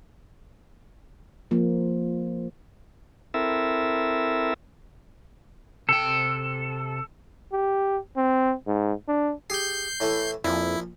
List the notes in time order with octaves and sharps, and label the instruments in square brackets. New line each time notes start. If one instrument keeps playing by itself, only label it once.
[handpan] F3 A#3
[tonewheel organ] C4 E4 A4 A#4 E5
[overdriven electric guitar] C3 G5 [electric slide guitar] A4
[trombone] G4
C4
G#2
D4
[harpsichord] G4 G#4 [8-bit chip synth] G6 C7
[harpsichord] A2 E3 A3
[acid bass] F2 [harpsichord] A#2 F3 [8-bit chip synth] E4